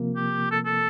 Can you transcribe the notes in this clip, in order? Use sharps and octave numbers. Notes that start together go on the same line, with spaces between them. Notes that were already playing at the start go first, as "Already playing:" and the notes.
Already playing: C3 F3 A#3
G4
A4
A4